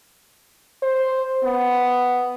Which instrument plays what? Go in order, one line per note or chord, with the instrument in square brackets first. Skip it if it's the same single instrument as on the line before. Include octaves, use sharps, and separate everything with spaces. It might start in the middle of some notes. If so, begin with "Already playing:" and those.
[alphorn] C5
B3